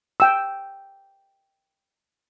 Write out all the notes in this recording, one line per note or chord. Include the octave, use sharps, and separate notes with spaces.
G5 E6